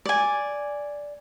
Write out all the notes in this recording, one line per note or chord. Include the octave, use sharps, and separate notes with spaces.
D5 G#5